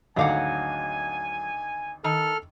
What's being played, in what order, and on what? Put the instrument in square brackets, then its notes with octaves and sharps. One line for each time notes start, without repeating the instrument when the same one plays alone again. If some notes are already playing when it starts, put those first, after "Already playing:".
[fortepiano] G#1 D2 D6 [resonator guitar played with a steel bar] F#3 F5 F#5 [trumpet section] G#5
[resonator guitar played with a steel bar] D#3 [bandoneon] A4 F6